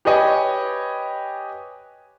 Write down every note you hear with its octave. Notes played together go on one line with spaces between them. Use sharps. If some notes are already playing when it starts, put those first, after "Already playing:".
G4 B4 C#5 D#5 G#5